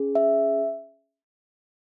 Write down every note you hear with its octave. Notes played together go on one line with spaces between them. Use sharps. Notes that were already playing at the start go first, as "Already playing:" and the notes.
Already playing: C#4 G#4
E5